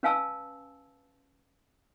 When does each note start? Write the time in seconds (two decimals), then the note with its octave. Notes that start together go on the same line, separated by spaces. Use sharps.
0.03 C#4 B4 F5 G#5 A5 E6